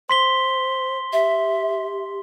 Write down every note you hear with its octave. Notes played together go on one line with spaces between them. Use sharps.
C5 C6 B6 G7
G4 E5